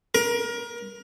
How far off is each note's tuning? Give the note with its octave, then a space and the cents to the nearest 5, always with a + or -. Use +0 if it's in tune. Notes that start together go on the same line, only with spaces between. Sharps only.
A#4 +25